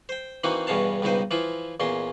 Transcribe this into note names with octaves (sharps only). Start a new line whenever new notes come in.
C5 G5
E3 A#3 C4 D#4 F#4
E2 G2 B2 C#4 F5 A5
C#2 G2 B2 D#4 C5
E3 F3 E4 F4
E2 A#2 C#4 C6